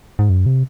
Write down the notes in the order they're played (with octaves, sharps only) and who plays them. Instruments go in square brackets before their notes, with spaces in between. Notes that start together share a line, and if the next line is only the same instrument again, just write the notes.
[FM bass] G#2
F#2
C3